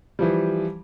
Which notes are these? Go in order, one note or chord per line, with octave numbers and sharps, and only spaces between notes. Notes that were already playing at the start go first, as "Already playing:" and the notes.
E3 F3 G3